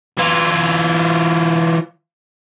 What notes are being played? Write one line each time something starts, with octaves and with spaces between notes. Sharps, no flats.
E3 F4